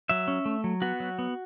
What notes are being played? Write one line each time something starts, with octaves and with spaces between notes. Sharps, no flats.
F#3 E5
C#4
A3
F#3
B3 F#4
F#3
B3